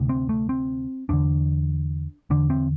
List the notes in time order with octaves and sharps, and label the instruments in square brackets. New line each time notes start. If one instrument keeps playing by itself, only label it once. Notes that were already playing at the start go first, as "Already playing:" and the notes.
Already playing: [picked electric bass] D2 C3
C4
A3
C4
E2 D3 D4
E2 D3 D4
C4